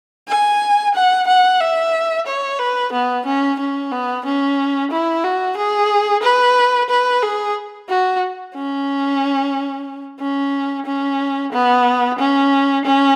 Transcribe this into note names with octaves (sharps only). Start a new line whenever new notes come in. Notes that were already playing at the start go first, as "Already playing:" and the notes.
G#5
F#5
F#5
E5
C#5
B4
B3
C#4
C#4
B3
C#4
E4
F#4
G#4
B4
B4
G#4
F#4
C#4
C#4
C#4
B3
C#4
C#4